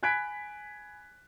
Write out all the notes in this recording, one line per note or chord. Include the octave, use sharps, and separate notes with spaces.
G#5 B5 F#6 G#6 B6 D7